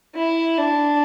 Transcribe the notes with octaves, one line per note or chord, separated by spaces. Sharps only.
E4
D4